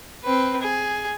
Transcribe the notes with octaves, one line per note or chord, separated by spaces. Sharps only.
C4 B4
G#4